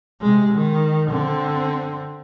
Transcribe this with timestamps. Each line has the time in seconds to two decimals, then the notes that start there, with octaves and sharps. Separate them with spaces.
0.21 C3 G#3
0.52 D#3
1.10 D3 C4